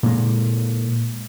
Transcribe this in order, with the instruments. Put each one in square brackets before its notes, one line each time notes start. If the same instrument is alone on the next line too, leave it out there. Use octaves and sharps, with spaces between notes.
[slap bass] A#2 G#3